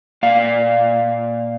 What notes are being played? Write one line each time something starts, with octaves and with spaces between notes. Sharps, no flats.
A#2 D5 F5